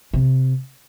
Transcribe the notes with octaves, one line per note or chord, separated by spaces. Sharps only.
C3